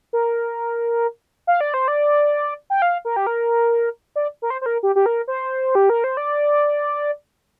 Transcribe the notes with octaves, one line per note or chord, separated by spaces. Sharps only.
A#4
F5
D5
C5
D5
G5
F5
A#4
G4
A#4
D5
A#4
C5
C5
A#4
G4
G4
A#4
C5
G4
A#4
C5
D5